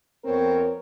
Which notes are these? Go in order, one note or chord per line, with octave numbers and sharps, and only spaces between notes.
F2 B3 C4 A#4 C#5